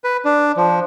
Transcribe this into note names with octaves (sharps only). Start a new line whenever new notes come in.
B4
D4
F3